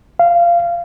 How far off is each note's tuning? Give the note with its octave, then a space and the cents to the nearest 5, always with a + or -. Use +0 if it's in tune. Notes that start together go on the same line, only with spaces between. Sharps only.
F5 -20